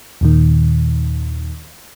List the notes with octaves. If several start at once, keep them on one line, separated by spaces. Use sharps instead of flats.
D#2 A#2 D#3